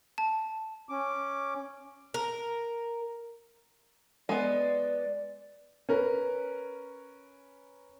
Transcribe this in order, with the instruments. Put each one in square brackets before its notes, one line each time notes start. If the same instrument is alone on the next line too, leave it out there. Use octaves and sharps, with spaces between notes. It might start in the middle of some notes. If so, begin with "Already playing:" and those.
[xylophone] A5
[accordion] C#4 D6
[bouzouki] A#4
[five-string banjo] G#3 B3 [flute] D5
[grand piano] C#4 A#4 B4